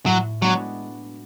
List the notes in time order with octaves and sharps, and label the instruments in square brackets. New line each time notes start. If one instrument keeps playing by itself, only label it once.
[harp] A2 [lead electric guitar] F#3
[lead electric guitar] F#3 [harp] G#3 B3 D4 F#4